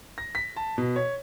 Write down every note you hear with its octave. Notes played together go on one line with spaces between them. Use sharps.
A#6
B6
A5
B2
C#5